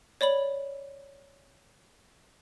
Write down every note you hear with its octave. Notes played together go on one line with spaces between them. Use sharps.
C#5 D5 B5 F#7